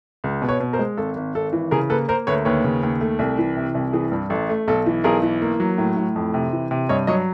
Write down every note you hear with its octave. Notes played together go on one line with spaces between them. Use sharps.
C#2
B2
B4 C#5
B2
A#4 C5
G#3
G#1 A4
G#1
G#1 A4
E3
C#3 G#4 A#4
A#3 A4 B4
A#3 A#4 C5
D2 B4 C#5
D#2 B4 C#5
C#3
D#2
A3
C2
E3
C3
C2
E3 G#4
G2
A1 A4
A3
B1 A4
E3
B1 G#4 A#4
E3
A#3
F#3
A2
A2
F2
C3
E3
C3
G2 C#5 D#5
F#3 C#5 D#5